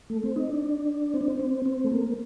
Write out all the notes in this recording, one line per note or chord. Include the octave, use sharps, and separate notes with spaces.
A3
C4
D#4
D4
C4
D4
C4
C4
C4
A3
A#3